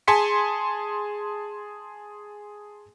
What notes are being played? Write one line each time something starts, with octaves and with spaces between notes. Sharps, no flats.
G#4 G#5 A5 C6 B6 C#7